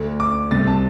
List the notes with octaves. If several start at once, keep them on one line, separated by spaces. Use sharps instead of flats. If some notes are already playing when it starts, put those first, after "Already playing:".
Already playing: D2 D3
D6
C2 C3 A6
A5